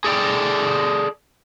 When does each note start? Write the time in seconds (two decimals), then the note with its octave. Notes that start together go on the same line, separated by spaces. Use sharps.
0.04 G#4 A4 D5 E5 G5